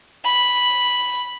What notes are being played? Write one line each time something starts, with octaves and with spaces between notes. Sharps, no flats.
B5